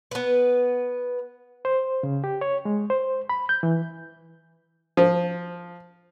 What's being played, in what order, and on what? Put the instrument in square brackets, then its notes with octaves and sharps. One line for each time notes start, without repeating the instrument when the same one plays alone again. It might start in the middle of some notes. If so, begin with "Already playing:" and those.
[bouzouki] B3 B4
[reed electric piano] C5
C#3
G4
C#5
G#3
C5
B5
G6
E3
[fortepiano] F3